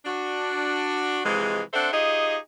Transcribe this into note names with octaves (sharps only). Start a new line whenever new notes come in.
D4 F#4
C3 E3 F3 G#3
C4 D4 A4 C5 E5 F#5
D#4 F4 G4 G#4 D#5